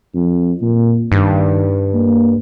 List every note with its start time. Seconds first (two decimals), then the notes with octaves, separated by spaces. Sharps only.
0.14 F2
0.62 A#2
1.12 G2 D#3
1.94 A#3